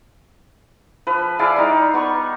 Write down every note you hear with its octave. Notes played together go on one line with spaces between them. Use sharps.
F3 B4
E4 G#4 D5 F5
G3 D#4
B3 C#6